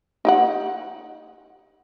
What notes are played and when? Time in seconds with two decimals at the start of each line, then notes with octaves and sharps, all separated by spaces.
0.25 D#4 G4 F#5